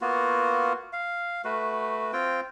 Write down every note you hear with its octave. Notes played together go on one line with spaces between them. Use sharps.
A#3 B3 F4 F#4
F5
A3 F#4 B4
C4 F4 G5